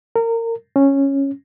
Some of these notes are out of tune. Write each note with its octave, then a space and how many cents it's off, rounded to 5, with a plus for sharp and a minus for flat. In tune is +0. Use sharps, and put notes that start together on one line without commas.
A#4 -25
C#4 -10